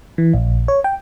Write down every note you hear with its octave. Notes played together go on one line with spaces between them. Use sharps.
E3
A#1
C#5
G5